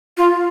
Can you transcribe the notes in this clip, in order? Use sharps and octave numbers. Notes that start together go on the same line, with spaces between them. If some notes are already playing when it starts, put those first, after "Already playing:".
F4